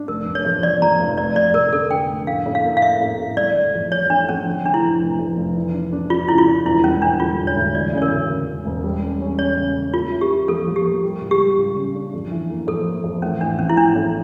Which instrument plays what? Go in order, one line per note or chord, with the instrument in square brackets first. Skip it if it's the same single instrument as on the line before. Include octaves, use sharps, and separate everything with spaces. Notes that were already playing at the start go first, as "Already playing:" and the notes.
Already playing: [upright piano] D4
[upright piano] F1 [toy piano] A#4
[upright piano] F1
[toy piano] C#5
[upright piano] F2
[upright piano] F3 [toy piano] D5
[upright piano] F3 [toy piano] A#5
[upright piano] F1
[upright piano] F1 [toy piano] D5
[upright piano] F1 [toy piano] D5
[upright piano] F1 [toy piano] A#4
[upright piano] D3 [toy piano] A4
[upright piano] D3 [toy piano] G5
[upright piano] F1
[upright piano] A2 [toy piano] F5
[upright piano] A2
[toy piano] F5
[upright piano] A#3
[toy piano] F5
[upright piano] E4 [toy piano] E5
[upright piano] A2
A2
[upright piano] G1 [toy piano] D5
[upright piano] G1
F2
[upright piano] E3 [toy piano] C#5
[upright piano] A3 [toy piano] D4
[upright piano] F2 [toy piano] C#4
[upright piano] D3
[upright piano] F1 [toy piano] D4
[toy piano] E4
[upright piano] F2
F1
F2
F1
E3
D4
D4
[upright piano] D4 [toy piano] F4
[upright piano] C#3 [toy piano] E4
[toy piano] F4
[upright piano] D4
[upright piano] E1 [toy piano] E4
[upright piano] G3 [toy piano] C#4
[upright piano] E1 [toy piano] D4
[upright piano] D3 [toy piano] F4
[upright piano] E1
[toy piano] C#5
[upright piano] D2
[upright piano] E3 [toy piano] D5
[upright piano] C#3 [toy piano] C#5
[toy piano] A#4
[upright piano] D2
C#3
E1
E1
G3
C#4
C#4
[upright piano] C#4 [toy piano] C#5
[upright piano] C#3
C#3
[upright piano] A#3 [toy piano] F4
[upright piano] E4
[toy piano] G4
[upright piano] E4
[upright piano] F3 [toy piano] A4
[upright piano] F3
[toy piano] G4
[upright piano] A#3
G3
C#2
[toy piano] G4
[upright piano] G3
C#2
C#3
D4
F2
E3
A#3
[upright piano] F2 [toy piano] A4
[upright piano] A#3
F2
[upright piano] A1 [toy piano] C#4
[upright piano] A1 [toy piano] D4
[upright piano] F3 [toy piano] C#4
[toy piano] E4
[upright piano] A1 [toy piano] D4
[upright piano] A2